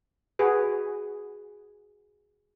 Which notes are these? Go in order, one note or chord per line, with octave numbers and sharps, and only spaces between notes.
F#4 G#4 B4